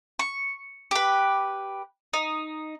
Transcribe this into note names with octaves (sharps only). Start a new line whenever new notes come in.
C#6
G4 B4
D#4